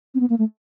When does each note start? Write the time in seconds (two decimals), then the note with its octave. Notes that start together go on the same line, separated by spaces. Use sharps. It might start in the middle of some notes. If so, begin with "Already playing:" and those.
0.15 C4
0.20 B3
0.30 A#3
0.39 A3